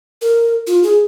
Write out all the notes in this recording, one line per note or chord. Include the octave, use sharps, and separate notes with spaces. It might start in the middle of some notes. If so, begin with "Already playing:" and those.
A#4
F4
G#4